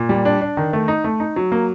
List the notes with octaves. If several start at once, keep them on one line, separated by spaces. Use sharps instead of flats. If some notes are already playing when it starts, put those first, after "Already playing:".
Already playing: A#2
G3
D4
D4
D#3
A3
D#4
A3
D#4
F#3
A#3